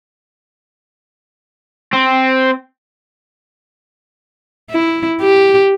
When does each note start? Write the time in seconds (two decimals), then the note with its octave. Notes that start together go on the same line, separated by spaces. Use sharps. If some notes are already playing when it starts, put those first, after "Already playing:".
1.93 C4
4.70 E4
5.21 G4